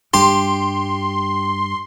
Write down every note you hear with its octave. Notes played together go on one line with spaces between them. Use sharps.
G2 G3 D4 G4 C6